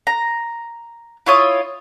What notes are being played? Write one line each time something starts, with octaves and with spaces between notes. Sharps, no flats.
A#5
E4 F4 C#5 D#6